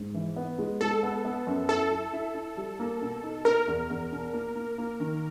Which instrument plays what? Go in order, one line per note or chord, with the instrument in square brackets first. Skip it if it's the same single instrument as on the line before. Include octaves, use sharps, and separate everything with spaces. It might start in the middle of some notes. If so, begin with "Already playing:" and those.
Already playing: [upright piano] G#2
E3
B3
G#3
[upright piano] G#3 [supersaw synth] A4
[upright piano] B3
B3
F#2
[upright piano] E4 [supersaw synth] A4
[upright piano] E4
E4
E4
G3
A#3
B2
D#4
[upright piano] B2 [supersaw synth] A#4
[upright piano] E2
E2
B2
A#3
A#3
A#3
D#3